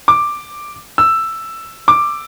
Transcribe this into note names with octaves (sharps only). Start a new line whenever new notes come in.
D6
E6
D6